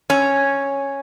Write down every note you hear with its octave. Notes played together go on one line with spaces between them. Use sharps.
C#4